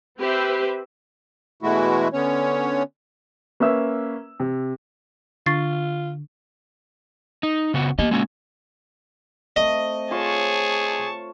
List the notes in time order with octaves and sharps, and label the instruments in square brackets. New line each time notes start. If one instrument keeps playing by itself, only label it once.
[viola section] C4 G4 B4 C5 E5
[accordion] B2 E3 G#3 A3 E4 F#4
D3 B3 C#4 C#5
[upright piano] A#3 C#4 B4 E5 E6
C3
[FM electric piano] D3 [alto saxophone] F4 [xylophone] C#6 A6 C7
[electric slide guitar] D#4
C#3 B3 F#4
[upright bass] A#3 [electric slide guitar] G4 D#5
[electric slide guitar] G#3 C#4 F#4
[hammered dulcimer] A3 C4 [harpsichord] D#5
[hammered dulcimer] F4 C5 C#5 [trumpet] G#4 [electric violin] A5 C#6